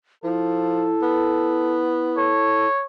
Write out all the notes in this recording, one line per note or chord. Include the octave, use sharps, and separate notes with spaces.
F3 E4 A4
B3
A4 C#5